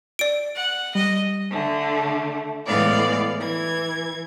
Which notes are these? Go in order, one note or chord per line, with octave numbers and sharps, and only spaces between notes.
D5 D7
F#5
G3 D#5
D3 A3
A2 E3 G#3 B3 D5 F5
E3 G#6